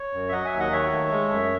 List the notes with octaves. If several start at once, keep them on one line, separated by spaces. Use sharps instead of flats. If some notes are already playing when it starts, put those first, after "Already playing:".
Already playing: C#5
F#2
E5
F#3 D#5 F#5
E5 G#5
D#2
D#5 F#5
D#3 C#5 E5
A3
G#3
F#2